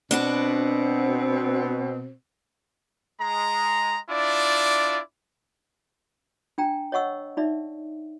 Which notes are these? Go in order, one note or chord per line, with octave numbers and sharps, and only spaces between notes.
B2 C4 D4 F#4 B4
G#3 A#5
D4 E4 F4 D5
D4 G5 A#5
C#5 D#5 F#5 C#6 E6
D#4 D5 E5